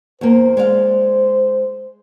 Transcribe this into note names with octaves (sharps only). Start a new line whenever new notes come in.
E2 A#3 C5
G#3 D5 F5